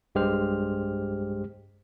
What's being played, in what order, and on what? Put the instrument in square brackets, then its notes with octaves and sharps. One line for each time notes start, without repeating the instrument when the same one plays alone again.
[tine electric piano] B1 G2 G#3 G4 C5 F6